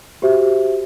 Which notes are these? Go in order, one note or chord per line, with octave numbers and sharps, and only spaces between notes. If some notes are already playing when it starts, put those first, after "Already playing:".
F#4 G4 C5 E5